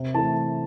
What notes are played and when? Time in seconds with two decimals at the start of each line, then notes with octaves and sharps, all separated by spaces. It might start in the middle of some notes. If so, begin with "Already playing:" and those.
Already playing: C3
0.14 E3 A5
0.18 A3